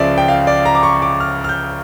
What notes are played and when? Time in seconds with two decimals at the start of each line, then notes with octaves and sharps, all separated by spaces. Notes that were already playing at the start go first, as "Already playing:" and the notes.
Already playing: C#2 C#3 F3 D5 E5
0.18 G5
0.28 F5
0.47 D5
0.66 A#5
0.75 D6
0.83 C#6
1.02 D6
1.20 F6
1.44 F6
1.49 G6